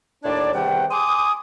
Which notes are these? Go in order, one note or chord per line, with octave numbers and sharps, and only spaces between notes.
D#2 A2 D4 C#5 D5
E2 C3 D#3 G3 F#5 G5
G#5 C6 D6 D#6